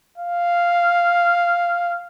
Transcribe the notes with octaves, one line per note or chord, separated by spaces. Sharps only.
F5